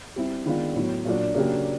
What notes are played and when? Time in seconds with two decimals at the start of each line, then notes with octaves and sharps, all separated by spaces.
0.16 G3 C4 E4
0.46 D#3 G#3 B3 D4 F4
0.76 A2 F#3 B3
1.05 A#2 F#3 A#3 D4 F#4
1.35 C#3 F#3 A#3 D4 G4